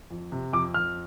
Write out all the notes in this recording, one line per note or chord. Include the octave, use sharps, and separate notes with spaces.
F2
C3
F2 D6
F2 F6